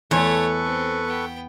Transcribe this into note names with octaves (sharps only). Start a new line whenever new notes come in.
E2 A3 A4 B4 C#5 C#6
C4
B3 G5